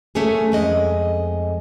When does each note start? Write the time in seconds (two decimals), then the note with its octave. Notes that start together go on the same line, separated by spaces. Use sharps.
0.15 A3 A#3 C#4 G#4
0.52 F2 G#3 D#5